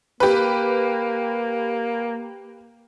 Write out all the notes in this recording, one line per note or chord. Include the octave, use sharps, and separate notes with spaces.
A#3 G4 B4